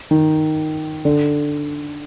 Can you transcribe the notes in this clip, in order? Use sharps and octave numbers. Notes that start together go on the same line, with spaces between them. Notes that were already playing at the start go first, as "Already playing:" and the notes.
D#3
D3